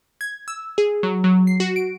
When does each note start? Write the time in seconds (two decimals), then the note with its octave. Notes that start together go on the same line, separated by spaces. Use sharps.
0.21 G#6
0.48 E6
0.78 G#4
1.03 F#3
1.24 F#3
1.47 C7
1.60 F#4
1.76 D7